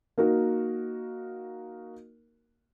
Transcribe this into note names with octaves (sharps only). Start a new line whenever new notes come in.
A#3 D#4 F#4 A#4